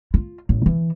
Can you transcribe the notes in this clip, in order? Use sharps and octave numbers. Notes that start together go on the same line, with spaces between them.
F4
A1
E3